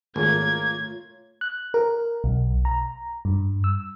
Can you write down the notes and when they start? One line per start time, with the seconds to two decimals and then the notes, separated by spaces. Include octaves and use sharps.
0.16 G#1 A3 A#3 F4 C#5 G#6
1.41 F#6
1.74 A#4
2.24 B1
2.65 A#5
3.25 G2
3.64 E6